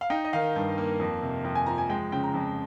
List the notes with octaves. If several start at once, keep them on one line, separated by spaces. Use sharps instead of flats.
F5
D#4 G5
D#5
D#3 F5
G2
A#3
F2
C3
F2
G#5
F3 A#5
G#5
G#3 G5
C#3 G5
A#5
F2